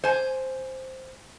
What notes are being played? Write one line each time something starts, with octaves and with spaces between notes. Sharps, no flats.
C5 G#5